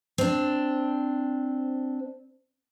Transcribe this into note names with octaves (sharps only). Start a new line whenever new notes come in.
C4 D4